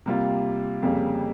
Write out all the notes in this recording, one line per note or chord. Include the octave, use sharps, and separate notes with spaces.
C3 G3 A#3 F4
F2 C#3 G3 A#3